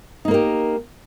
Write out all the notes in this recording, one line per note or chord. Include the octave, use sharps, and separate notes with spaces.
A#3 D#4 G4 A#4